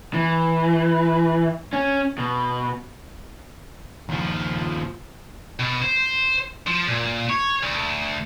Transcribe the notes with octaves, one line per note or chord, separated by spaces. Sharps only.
E3
C#4
B2
D#2 F3
B2
C5
F3
A#2
C#5
D2